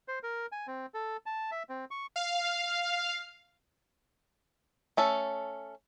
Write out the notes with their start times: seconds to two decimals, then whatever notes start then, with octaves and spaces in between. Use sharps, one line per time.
0.08 C5
0.23 A#4
0.52 G#5
0.67 C4
0.94 A4
1.26 A5
1.51 E5
1.69 C4
1.91 C#6
2.16 F5
4.97 A3 C#4 A4